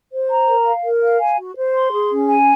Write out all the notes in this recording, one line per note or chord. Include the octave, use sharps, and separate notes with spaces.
C5
A#5
A#4
F5
A#4
F5
G#5
F#4
C5
C6
G#4
C#4
G#5